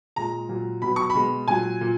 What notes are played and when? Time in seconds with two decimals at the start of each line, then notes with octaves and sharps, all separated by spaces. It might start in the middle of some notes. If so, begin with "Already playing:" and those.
0.16 A#2 G#3 A#5
0.49 A#2 F#3
0.82 B2 F#3 B5
0.96 C#6
1.10 B5
1.15 B2 G#3
1.48 A#2 F#3 G#5
1.81 A#2